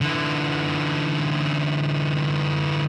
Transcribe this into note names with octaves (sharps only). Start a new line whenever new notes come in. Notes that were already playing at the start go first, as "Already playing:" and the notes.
D3 E3